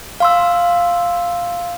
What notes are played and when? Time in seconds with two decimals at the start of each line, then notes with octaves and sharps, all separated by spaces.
0.20 F5 C6 E6